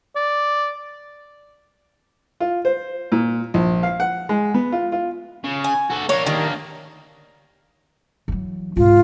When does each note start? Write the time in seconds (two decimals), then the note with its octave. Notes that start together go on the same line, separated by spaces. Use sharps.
0.16 D5
2.40 F4
2.65 C5
3.12 A#2
3.54 A#1
3.83 F5
4.00 F#5
4.29 G#3
4.54 B3
4.72 F4
4.92 F4
5.44 C#3
5.64 G#5
5.90 F#4 A4
6.09 A#3 D4 C#5
6.26 D#3 G3
8.28 E3 F#3
8.77 G#2 C3 F4